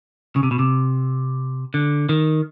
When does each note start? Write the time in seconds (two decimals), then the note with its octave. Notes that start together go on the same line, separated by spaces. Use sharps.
0.36 C#3
0.43 C3
0.51 B2
0.59 C3
1.74 D3
2.09 D#3